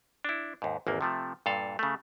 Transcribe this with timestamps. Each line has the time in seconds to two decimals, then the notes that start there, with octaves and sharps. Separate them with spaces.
0.24 D4 E4
0.62 D#2 G#2
0.87 G#1 E2 A#3 D5
1.01 C3 F3 A3
1.46 G2 A#2 A4 F5
1.79 C#3 A3